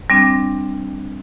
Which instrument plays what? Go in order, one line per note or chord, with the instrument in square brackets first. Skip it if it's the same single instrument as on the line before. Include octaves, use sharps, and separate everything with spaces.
[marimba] G3 C4 D4